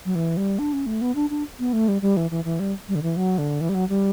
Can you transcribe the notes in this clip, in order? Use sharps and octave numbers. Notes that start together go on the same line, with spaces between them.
F#3
E3
G3
D4
C#4
A3
B3
D4
D4
B3
A3
G3
G3
E3
E3
E3
G3
G3
D3
E3
F#3
D3
E3
G3
F#3
G3